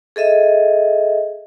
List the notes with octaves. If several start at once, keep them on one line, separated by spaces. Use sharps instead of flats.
G#4 A4 D#5 E5